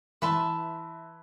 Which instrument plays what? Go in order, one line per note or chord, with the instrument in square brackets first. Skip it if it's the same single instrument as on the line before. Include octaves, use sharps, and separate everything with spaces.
[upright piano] E3 [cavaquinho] B4 E5 A5 C6